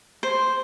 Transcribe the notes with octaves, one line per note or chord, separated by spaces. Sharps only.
C5